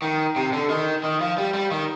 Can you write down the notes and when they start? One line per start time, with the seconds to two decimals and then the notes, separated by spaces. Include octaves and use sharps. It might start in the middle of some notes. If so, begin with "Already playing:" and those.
0.02 D#3
0.36 C3
0.53 D3
0.70 D#3
1.04 D#3
1.21 F3
1.38 G3
1.54 G3
1.71 D#3